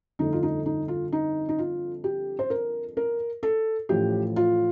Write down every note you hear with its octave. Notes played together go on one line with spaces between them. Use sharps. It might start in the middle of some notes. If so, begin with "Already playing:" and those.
G1 F2 D3 A3 D4 D#4
F4
D#4
D#4
F4
D#4
D#4
F4
G4
C5
A#4
A#4
A4
A1 A2 F3 G4
F4